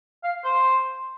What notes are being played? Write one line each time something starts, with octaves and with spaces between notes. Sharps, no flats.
F5
C5